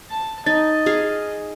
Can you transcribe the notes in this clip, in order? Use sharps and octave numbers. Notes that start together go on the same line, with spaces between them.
A5
D#4 D#5 A6
G#4 F5